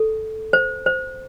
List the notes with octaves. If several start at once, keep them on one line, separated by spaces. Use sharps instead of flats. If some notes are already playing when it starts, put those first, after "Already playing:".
Already playing: A4
C5
C5